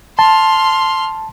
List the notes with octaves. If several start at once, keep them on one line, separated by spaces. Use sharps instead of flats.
A5 C6 F6